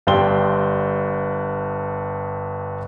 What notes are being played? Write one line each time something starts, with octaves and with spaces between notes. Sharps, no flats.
G1 G2 D5 G5 C6 G7